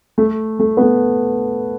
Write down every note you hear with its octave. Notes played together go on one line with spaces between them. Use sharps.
A3
A3
B3
A3